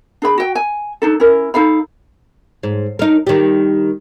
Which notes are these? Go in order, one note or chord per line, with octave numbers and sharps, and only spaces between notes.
D4 G#4 B5
F#4 G5
G#5
D4 D#4 A4
C#4 E4 A#4
D#4 A4 F5 B5
G#2
D#4 A#4
D#3 G3